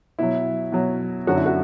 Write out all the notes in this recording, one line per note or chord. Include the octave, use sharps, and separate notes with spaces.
B2 F#3 E4
B2 F#3
F#2 D3 F#3 F#4
E4
F#4